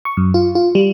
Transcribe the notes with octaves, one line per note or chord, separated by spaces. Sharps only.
C#6
F#2
F4
F4
G3